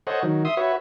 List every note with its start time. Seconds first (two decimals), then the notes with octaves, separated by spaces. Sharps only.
0.07 A4 C5 C#5 D#5 F#5
0.23 D#3 F#3
0.45 E5 C6 D#6
0.57 F#4 B4 C#5 E5